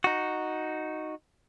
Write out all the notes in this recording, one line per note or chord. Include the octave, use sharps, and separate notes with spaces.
D#4 F#4